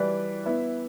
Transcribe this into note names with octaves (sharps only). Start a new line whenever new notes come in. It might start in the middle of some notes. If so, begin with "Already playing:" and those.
Already playing: E3 G3 E4 B4 D5
B3 E4 B4 E5